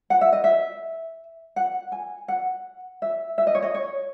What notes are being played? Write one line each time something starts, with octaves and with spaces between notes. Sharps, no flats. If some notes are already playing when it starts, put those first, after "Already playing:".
F#5
E5
D#5
E5
F#5
G#5
F#5
E5
E5
D#5
C#5
D#5
C#5